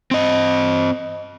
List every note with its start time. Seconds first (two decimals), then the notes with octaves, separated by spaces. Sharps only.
0.11 C4 D#5